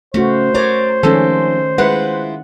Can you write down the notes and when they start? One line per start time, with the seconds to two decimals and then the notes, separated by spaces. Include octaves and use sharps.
0.14 C#3 A3 C#4 F#4 C5
0.54 A#4 C#5 D5 A#5
1.03 D#3 F3 G#3 C4 C#4 A4
1.78 G#3 E4 F4 B4 F#5